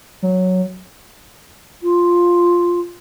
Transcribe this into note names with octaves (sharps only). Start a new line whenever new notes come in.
F#3
F4